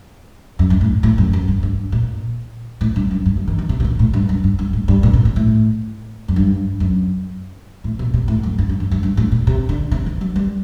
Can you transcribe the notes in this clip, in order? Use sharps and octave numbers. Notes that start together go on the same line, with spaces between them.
F#2
G2
A2
A2
F#2
F#2
G2
G2
A#2
A2
G2
F#2
G2
D3
D#3
D#3
C3
C3
A#2
A2
G2
F#2
G2
G2
A2
G2
A#2
C3
A#2
A2
F#2
G2
F#2
A2
A#2
C3
A2
F#2
G2
G2
G2
G2
G2
A2
A#2
C3
D3
C3
D#3
F#3
G3